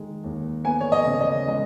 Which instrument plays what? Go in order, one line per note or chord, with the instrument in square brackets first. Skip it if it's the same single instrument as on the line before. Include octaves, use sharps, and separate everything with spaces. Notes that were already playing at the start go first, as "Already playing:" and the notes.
Already playing: [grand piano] D#3 G#3
D#2
B3 G#5
C#5
D#5
C#3
D#5
G#3 D#5